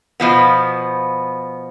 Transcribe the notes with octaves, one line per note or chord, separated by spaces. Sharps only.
B2 F3 B3